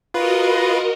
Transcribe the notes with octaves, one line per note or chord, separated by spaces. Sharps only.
F4 F#4 A#4 B4 D#5